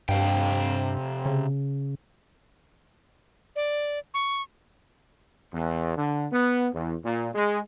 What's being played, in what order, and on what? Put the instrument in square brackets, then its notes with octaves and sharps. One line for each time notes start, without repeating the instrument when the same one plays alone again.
[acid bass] G2 [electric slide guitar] C3 F5 G5
[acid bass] C#3
[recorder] D5
C#6
[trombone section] E2
D3
B3
E2
A#2
G#3